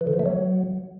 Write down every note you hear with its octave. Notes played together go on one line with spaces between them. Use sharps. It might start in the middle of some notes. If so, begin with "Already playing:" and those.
E3
D3
F3
A3
F#3